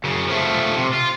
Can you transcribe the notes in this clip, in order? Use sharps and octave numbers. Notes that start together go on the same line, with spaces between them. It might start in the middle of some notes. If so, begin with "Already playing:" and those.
F#2 C#3
F3 A3
C3
F4